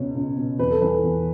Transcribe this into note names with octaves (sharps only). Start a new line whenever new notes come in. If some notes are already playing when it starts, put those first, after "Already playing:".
Already playing: C#2 B2 C#5
C#2
B2
E2 B4
A4
E3 B4
A4
E2